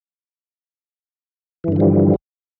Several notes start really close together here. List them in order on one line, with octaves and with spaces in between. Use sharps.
E3 G2 D3 F3 G3